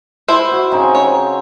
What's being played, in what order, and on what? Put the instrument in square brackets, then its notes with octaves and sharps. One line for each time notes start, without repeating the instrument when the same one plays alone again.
[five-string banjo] E4 C5
[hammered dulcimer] F#4
C#3 C4 D#4
[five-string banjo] C#5